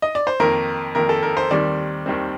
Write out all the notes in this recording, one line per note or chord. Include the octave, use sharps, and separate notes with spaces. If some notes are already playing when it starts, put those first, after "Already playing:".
D#5
D5
C5
F2 D#3 A#3 A#4
F2 D#3 A#3 A#4
A4
A#4
C5
D#2 D#3 G3 C4 D5
D#2 D#3 G3 C4